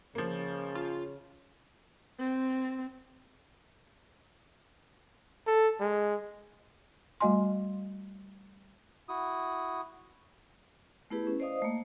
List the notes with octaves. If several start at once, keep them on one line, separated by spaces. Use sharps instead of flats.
C#3 F3 A#3
F4
C4
A4
G#3
G3 A3 F#4 D#5 G#5 C6
E4 F#4 D#6
A3 B3 E4 G4 G#4 B4
C#4
C5 D5 D#5 F5 D#6
A3 A#3